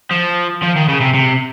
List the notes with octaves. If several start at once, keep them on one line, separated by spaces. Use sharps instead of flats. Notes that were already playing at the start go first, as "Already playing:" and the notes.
F3
F3
D#3
C#3
C3
C3